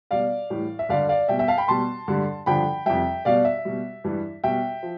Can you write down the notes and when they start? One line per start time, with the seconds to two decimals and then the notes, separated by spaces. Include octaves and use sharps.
0.11 B2 G3 D5 F5
0.50 A2 E3 G3
0.79 E5
0.89 G2 D3 G3 D5 F5
1.09 D5 F5
1.28 B2 G3 E5 G5
1.39 E5 G5
1.48 F5 A5
1.58 G5 B5
1.68 B2 G3 A5 C6
2.08 G2 D3 G3
2.46 G2 D3 F3 G5 B5
2.86 F2 C3 G3 E5 G5
3.25 B2 G3 D5 F5
3.45 E5
3.65 B2 G3
4.04 G2 E3 G3
4.44 B2 G3 E5 G5
4.83 F3